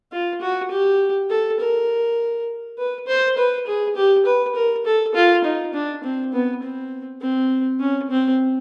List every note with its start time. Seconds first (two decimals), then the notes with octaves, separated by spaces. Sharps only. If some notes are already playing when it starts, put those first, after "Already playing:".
0.12 F4
0.41 F#4
0.71 G4
1.30 A4
1.60 A#4
2.78 B4
3.07 C5
3.37 B4
3.67 G#4
3.96 G4
4.26 B4
4.55 A#4
4.85 A4
5.15 F4
5.44 D#4
5.74 D4
6.04 C4
6.33 B3
6.62 C4
7.22 C4
7.80 C#4
8.10 C4